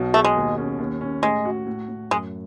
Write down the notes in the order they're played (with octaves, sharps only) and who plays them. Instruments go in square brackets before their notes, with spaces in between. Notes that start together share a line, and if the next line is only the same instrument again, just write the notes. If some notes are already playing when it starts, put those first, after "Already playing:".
Already playing: [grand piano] B1 B2
[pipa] A3 [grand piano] G#4
[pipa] G#3
[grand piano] D#2
C#4
D#2
C#4
[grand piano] A2 [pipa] G#3
[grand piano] F#4
A2
A2
[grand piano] F#2 [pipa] G#3